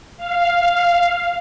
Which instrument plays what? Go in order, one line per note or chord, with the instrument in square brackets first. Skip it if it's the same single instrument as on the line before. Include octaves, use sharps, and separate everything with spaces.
[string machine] F5